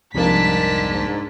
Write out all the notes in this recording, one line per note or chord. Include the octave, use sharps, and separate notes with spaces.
C2 F2 G#2 A#3 D4 A5 B6